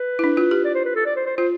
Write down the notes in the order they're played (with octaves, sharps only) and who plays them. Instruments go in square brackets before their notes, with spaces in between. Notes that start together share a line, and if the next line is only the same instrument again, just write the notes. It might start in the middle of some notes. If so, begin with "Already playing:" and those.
Already playing: [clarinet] B4
[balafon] E4
D4
F4
G4
[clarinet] D5
C5
B4
A4
D5
C5
C5
[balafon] F4 [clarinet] C5